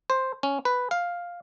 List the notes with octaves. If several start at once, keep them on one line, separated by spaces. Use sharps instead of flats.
C5
C#4
B4
F5